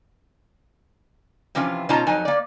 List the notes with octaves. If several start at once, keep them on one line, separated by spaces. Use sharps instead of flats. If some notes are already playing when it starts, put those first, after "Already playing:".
C3 E3 F3 C#4 F4
B2 C#4 D#4 F4 A5 A#5
F2 F#3 D#4 G#5
A#3 D5